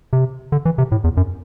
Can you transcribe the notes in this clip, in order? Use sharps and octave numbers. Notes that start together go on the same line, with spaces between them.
C3
D3
E3
C3
A2
E2
F#2